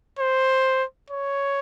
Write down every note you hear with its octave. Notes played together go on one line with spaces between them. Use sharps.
C5
C#5